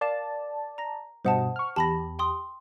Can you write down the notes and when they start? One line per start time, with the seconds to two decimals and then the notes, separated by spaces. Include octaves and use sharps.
0.01 A#4 D5 F5 A5 E7
0.78 A#5 A#6
1.25 G2 B2 C5 D#5 F#5 A5
1.56 C#6 F6
1.76 E2 G4 A5 B5 A#6
2.19 G5 C6 D#6